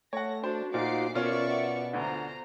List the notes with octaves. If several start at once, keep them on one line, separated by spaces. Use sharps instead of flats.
A3 C#5 F#5 A#6
D4 F#4 C5
A#2 D#4 F4 C5 F#5 D6 C7
B2 C#4 F4 A#4 D5 E5 C#6
F#5
D2 D3 F4 C5 A#5